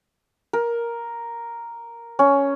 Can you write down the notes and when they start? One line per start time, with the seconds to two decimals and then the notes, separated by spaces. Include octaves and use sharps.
0.53 A#4
2.19 C#4